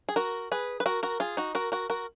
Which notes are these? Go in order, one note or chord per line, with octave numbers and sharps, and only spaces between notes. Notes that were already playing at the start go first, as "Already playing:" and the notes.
G#4
F#4 A#4
G#4 B4
B4
F#4 A#4
F#4 A#4
F4 G#4
D#4 F#4
F#4 A#4
F#4 A#4
F#4 A#4